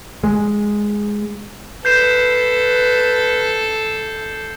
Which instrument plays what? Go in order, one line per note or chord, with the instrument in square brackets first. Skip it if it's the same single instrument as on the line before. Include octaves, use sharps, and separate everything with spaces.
[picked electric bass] G#3
[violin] A4 [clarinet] B4 [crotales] G6 C7 E7